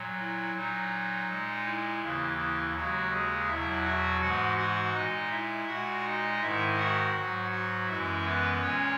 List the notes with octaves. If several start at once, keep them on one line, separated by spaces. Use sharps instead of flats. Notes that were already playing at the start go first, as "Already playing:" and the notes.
Already playing: A#2 F#3
E4
A#2 F#3 D#4
A#2 G#3
E4
D#2 C#3 E3
E4
D#2 C#3 F#3 G#3 F#4
G#3 G#4
E2 B2 F#3 E4 E5
F#4 F#5
G#2 E3 G#3 F#4 F#5
F#4 F#5
A#2 G#3 D#4 D#5
E4 E5
A#2 G#3 F#4 F#5
D#4 D#5
G#2 D#3 G#3 E4 E5
F#4 F#5
G#2 F#3
F#4 F#5
F#2 E3 G#3 E4 E5
B3 B4
A#2 G#3 C#4 C#5